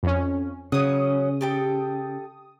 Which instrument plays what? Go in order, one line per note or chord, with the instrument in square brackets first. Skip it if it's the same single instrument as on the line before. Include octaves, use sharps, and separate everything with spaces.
[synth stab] F2 C#4
[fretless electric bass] C#3 [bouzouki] F#3 C#4 [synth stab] D#6
[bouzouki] G4 A4 G5